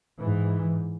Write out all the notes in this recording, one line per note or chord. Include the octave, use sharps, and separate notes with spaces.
G#2 E3